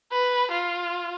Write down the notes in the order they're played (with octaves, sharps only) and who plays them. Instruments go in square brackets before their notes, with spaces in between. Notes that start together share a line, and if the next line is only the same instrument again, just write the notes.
[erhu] B4
F4